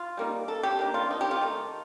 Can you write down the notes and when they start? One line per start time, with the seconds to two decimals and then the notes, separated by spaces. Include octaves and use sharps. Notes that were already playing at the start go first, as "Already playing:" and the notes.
Already playing: F4
0.17 G3 A#3 D#4
0.48 A4
0.63 G4
0.79 D#3 A#3 D4
0.94 F4
1.11 D#4
1.21 G4
1.31 F4
1.41 D#3 A3 D#4